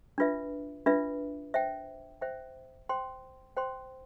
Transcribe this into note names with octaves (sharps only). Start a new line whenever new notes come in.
D4 F4 B4 E5
D4 F4 B4 E5
C5 E5 G5
C5 E5 G5
C5 G5 C6
C5 G5 C6